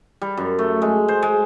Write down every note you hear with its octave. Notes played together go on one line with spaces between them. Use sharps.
G3
F#2
A3
G#3
C5
G#3